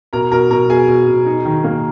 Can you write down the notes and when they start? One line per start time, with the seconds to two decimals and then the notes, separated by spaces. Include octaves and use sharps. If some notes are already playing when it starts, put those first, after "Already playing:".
0.13 B2 A#4 A#5
0.32 B2 A#4 A#5
0.51 B2 A#4 A#5
0.70 B2 G#4 G#5
0.89 B2
1.08 B2
1.26 D#4
1.45 D#3
1.64 A#3